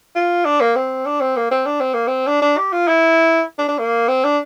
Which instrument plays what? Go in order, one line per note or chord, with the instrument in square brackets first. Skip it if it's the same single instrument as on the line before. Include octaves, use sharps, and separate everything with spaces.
[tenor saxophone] F4
D4
A#3
C4
D4
C4
A#3
C4
D4
C4
A#3
C4
D4
D4
G4
F4
E4
D4
D4
A#3
C4
D4